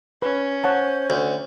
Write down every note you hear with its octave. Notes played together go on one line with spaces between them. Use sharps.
C#4 B4
C5 C#5 F#5 A5
D2